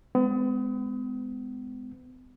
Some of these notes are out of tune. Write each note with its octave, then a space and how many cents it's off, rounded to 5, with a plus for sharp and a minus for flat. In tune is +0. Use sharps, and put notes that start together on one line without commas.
G#3 +0 B3 +45